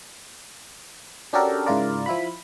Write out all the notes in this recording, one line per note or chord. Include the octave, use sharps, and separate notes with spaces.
C#4 D4 F#4 G4 A4 A#4
G#2 C#3 E4 F4 A#4 D5
F3 E4 F4 B5